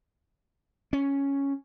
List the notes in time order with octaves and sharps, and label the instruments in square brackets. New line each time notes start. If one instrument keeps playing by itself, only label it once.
[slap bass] C#4